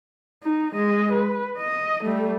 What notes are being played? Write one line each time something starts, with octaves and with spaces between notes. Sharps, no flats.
D#4
G#3 D#5
B4
D#5
G3 A3